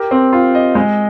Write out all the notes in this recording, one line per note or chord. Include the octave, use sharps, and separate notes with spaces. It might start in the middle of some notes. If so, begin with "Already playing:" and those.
Already playing: G4 A#4
C4
F4
D#5
G#3